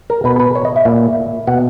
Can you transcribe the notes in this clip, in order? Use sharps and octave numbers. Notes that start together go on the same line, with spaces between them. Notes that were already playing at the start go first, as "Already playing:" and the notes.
A#4
B2 B4
B4
C#5
D#5
E5
A#2
B2 F#5